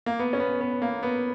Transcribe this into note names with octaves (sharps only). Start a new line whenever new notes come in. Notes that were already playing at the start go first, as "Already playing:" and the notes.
A#3
B3
C#4
B3
B3
A#3
B3